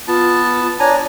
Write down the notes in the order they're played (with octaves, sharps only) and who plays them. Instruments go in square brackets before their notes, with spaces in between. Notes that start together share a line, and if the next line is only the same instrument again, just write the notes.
[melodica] B3 A5 [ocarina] F4
[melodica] D4 G#5 A#5 [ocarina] C#5